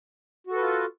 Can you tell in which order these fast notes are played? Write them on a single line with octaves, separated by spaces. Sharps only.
F#4 A4 B4 F4